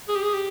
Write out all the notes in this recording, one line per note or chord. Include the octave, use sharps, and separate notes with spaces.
G#4
G4
G#4
G4